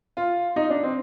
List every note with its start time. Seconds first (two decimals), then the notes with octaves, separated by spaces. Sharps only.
0.17 F4
0.56 D#4
0.70 D4
0.83 C4